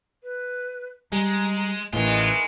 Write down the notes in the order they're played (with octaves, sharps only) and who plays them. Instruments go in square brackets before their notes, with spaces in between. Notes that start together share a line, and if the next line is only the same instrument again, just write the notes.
[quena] B4
[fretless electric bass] G3 [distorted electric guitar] G#3 [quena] A#5
[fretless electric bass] A1 A2 [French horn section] D#3 E3 G#3 [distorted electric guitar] F4 [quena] B4